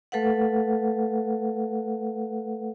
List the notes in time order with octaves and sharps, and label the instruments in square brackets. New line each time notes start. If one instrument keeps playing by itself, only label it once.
[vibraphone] A3 A4 B4 F5 F#5